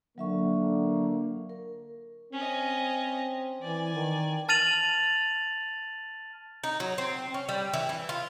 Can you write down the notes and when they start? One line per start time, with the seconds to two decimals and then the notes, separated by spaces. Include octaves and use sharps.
0.18 D3 F#3 A#3 E5 C#6
1.50 A#4
2.33 C4 C#4 D#5
3.62 E3 D5 G#5
3.95 D#3
4.49 A5 F6 A6 D#7 F7 F#7
6.64 D#4
6.80 F#3
6.98 C4
7.34 C#4
7.49 G3
7.74 E3
7.89 E3
8.09 F4